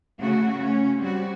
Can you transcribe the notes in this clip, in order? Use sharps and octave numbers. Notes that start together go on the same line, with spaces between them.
C#3 A3 F#4
C#4
G3 C4 F#4